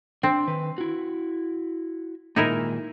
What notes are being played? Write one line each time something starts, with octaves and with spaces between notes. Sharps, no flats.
C4 D4
D#3 B4
E4 F#4
A#2 D#3 G#3 D#4 E4 A#4